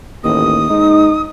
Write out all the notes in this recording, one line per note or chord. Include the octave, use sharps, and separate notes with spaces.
A1 D#2 D#6
G#2 D#4